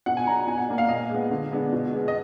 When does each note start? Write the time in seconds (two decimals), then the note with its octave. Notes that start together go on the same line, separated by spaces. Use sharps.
0.06 B2 F#5
0.17 G#5
0.27 F#3 D4 A#5
0.47 B2 G#5
0.58 F#5
0.68 A#3 D4
0.78 F5
0.89 A#2 D#5
1.10 G#3 B3
1.30 D3
1.52 G#3 B3 D4
1.73 B2
1.93 G#3 B3
2.08 D#5